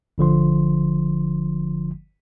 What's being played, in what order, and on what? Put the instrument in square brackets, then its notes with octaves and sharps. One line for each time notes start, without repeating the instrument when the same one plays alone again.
[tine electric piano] G1 D3 F3 C6